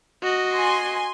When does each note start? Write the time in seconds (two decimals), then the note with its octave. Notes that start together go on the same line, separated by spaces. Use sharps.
0.23 F#4 D#5
0.54 G#5 C6